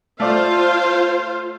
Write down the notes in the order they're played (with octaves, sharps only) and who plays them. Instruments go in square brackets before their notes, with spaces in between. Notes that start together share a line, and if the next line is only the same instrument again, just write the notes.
[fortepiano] A3 D5 [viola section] F4 C5 F5